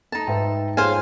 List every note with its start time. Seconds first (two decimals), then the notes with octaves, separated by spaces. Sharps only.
0.12 A3 D#4 A5
0.27 G#2 B4 E5 G5
0.77 F4 G#4 C5 C#5 F5 G#5